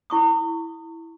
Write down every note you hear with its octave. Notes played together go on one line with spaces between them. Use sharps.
E4 C#6 D#6